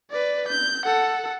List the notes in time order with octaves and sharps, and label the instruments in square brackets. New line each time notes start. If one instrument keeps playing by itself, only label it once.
[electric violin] B4 D5
G6
A4 F#5